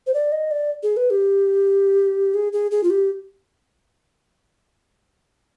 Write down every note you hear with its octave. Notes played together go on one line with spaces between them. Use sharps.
C5
D5
D#5
D5
G#4
B4
G4
G#4
G#4
G#4
F4
G4